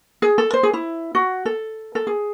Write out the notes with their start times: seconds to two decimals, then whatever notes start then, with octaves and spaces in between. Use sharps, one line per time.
0.22 G#4
0.38 A4
0.54 C5
0.63 G#4
0.73 E4
1.15 F#4
1.46 A4
1.95 A4
2.07 G#4